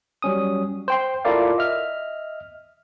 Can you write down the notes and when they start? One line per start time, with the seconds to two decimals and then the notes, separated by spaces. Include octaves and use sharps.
0.22 F#3 G3 C#4 D#6
0.88 C5 G5 C6
1.25 E4 F4 A4 A#4 D5 F5
1.58 D#5 E5 F6